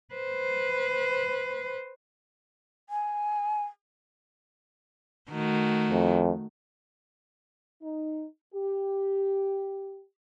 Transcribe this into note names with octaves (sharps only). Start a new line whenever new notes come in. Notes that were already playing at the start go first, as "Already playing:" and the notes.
B4 C5
G#5
D#3 A3 F#4
F2
D#4
G4